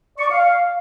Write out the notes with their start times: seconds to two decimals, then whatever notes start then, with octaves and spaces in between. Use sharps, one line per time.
0.18 D5 C#6
0.30 F5